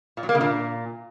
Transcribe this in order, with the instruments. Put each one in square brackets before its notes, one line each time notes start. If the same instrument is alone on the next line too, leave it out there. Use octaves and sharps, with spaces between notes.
[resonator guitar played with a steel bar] A#2
F#3
A#3
C#3
A#2